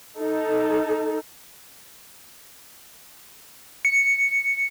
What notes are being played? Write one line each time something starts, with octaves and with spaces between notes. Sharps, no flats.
D#4 A4
C#7